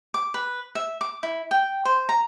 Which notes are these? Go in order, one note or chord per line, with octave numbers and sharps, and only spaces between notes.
D6
B4
E5
D6
E4
G5
C5
A#5